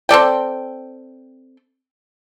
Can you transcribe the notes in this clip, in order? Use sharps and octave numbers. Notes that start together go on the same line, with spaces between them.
C4 A4 D5 G5